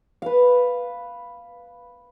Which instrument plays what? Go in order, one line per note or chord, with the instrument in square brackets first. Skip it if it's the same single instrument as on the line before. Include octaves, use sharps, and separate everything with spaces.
[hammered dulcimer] B4 F5